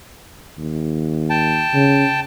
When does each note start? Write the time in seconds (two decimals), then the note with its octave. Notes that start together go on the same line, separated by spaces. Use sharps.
0.58 D#2
1.30 G5 A5
1.74 C#3